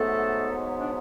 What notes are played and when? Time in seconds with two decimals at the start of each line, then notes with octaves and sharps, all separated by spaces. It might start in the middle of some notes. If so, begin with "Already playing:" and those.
Already playing: G#2 F#3 A3 B3 A4
0.80 D4